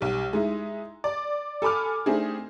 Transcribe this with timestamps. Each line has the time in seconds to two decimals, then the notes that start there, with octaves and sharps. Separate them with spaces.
0.01 B1 G3
0.33 G#3 D#4 E4
1.04 D5
1.62 A4 G#5 B5 D6 F6
2.06 A3 C4 D4 D#4 G#4